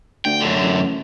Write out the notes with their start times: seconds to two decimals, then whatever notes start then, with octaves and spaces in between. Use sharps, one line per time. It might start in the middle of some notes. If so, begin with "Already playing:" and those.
0.25 D2 G5
0.41 F#2 D3
0.62 A1